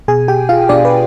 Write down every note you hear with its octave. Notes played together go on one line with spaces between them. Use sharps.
B2 G#4 G#5
G4 G5
F4 F5
B2 D4 D5
B4